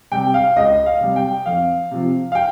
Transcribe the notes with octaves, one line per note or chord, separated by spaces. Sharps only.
C3 G3 G5
F5
C#2 D#5
F5
C3 G3
G5
F2 F5
C3 F3
F5
G5